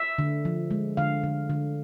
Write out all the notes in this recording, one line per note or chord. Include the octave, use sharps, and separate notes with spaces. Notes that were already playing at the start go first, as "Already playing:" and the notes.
Already playing: E5
D3
F3
G#3
D3 F5
D3
D3